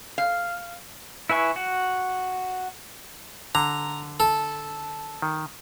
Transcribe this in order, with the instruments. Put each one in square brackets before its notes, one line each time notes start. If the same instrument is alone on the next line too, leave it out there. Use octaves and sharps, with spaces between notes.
[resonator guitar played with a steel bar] F5
[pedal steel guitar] E4 B4 G#5 C#6
F#4
[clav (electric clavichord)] D3 [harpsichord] A#5
[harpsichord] A4
[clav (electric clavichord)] D#3